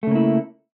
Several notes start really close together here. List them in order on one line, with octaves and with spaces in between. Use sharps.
A3 C#3 A#3 E4